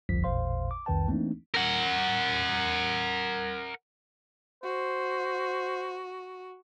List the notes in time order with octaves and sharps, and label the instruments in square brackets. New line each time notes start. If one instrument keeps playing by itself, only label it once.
[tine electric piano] G1 C2 F2 F3 B6
A1 E2 A#2 C5 F5 C6
D6
C2 F2 D#3 B4 G5 A5
E3 A3 A#3 C4 D4 D#4
[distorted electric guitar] A#4 F#5
[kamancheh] F#4 [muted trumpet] C5